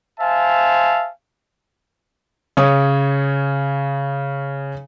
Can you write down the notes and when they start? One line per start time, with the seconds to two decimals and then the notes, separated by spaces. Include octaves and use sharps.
0.20 C5 E5 F5 G#5 A5
2.57 C#3 C#5 D#6